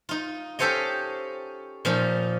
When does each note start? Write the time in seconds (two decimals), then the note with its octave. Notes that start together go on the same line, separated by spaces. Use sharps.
0.09 D#4 F4
0.59 C#4 G4 A4 C5 C#5 D#5
1.85 A#2 F3 C#4 D#4